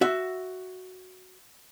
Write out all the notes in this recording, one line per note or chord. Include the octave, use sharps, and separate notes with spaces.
F#4 E5